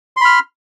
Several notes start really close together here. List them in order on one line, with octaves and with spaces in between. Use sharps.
C6 B5 F6